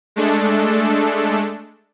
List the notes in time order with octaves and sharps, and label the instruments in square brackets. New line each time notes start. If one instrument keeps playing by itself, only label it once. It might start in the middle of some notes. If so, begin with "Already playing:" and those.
[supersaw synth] G#3 A3 D4 A4